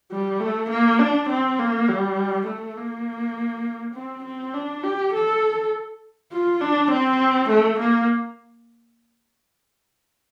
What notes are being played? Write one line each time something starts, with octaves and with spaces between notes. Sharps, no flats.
G3
A3
A#3
D4
C4
A#3
G3
A3
A#3
C4
C4
D4
G4
A4
F4
D4
C4
A3
A#3